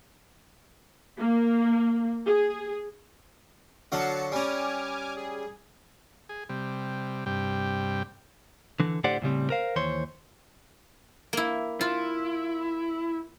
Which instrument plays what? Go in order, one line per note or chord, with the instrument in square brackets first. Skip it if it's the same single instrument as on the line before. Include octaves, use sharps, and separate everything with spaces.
[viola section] A#3
G#4
[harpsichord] D3 F#3 F5 [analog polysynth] F#4 A5 C#7
[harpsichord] G3 C#4 [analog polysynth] G#5 D6 F6
[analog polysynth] G#4
[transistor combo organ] G#4
C3 G3
G2 C3 G3 G5
[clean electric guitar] D3 E3
A2 D3 G4 C5 D5 F#5
A2 C#3 G3 C4
A#4 C5 F5
D#2 E3 C5 C#5 C6
[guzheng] A#3 E4
[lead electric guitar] E4 [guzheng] F4